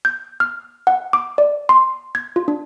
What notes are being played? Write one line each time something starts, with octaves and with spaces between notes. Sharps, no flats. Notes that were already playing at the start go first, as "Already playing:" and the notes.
G6
F6
F#5
D6
D5
C6
G#6
F4
D4